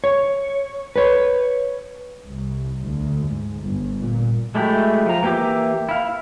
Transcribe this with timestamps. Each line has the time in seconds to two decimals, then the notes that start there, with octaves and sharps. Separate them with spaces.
0.04 C#5
0.96 B4 C#5
2.26 C2
2.87 D2
3.26 G#2
3.63 G1
3.99 A#2
4.55 F#3 G#3 A3 E4 G4
5.06 F3 A#5
5.23 E3 A#3 G4 E5 D6
5.89 E4 F5